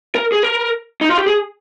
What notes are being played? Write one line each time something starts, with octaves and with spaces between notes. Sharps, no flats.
A#4
G#4
A#4
D#4
F4
G4
G#4